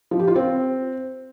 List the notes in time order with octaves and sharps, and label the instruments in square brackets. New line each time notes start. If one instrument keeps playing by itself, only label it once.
[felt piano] F3
G4
F4
C4